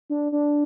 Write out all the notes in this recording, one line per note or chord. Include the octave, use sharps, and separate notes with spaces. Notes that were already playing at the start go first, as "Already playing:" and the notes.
D4
D4